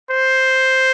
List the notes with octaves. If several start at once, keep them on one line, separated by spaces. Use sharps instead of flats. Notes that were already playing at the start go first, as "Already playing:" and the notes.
C5